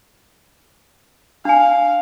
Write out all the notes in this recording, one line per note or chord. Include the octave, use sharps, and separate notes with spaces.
D4 F5 G#5